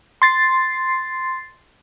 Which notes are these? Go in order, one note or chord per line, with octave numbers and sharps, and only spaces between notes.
C6 A6 C7